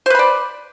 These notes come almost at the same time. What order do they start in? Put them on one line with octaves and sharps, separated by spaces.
C5 B4 B5 D5